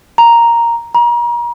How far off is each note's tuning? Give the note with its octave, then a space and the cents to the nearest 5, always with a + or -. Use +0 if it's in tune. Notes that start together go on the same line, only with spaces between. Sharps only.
A#5 +0
A#5 +35